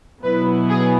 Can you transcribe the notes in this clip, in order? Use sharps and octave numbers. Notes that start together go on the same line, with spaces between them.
B2 F#3 B3 E4 B4
G#4